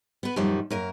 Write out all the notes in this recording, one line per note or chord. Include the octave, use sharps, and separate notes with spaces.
B3 B4
F#2 A#2 D#3 F3 G3
F#2 A#3 A#4